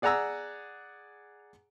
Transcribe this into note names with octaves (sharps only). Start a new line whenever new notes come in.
G#4 D5 F#5 G#5 A#5 E6